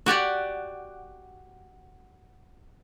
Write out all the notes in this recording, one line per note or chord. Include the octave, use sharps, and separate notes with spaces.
F#4 G4 D5 F#5